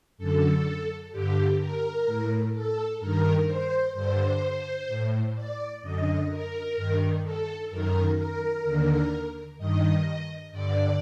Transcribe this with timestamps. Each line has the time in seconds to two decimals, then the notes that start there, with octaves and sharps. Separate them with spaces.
0.18 F#2 D3 A4
1.12 G2 D3 G4
1.59 A#4
2.06 A2
2.53 A4
3.00 G2 D#3 A#4
3.47 C5
3.94 G2 D3 C5
4.88 A2
5.35 D5
5.82 F#2 D3 D#5
6.29 A#4
6.76 G2 D#3
7.23 A4
7.70 F#2 D#3 A#4
8.17 A#4
8.64 D#2 D3
9.58 G2 D#3 D#5
10.52 G2 D3 D5